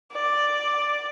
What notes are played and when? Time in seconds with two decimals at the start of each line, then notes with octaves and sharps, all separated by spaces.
0.12 D5